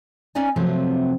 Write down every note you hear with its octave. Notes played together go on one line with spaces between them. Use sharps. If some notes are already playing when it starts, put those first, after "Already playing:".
B3 C#4 D#4 D5 G#5
C3 F3 F#3 A3 B3 C4